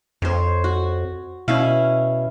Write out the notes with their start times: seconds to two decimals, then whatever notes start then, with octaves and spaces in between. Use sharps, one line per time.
0.22 F2 C5 C#5
0.64 F#4
1.48 B2 C#4 E4 F5